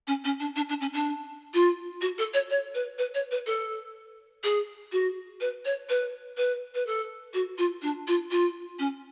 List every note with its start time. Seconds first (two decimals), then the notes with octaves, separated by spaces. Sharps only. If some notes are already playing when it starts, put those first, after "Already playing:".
0.07 C#4
0.24 C#4
0.40 D4
0.56 D4
0.69 D4
0.81 C#4
0.93 D4
1.54 F4
2.01 F#4
2.18 A4
2.34 C#5
2.50 C#5
2.74 B4
2.98 B4
3.14 C#5
3.31 B4
3.46 A4
4.44 G#4
4.92 F#4
5.41 B4
5.65 C#5
5.89 B4
6.37 B4
6.75 B4
6.86 A4
7.34 F#4
7.58 F4
7.82 D4
8.07 F4
8.31 F4
8.79 C#4